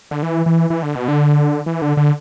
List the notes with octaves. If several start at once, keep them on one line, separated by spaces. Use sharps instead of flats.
D3
E3
E3
E3
D3
B2
D3
E3
D3
D3